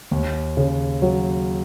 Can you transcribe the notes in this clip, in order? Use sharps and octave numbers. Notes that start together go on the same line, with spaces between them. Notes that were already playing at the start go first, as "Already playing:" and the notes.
D#2
C#3
F#3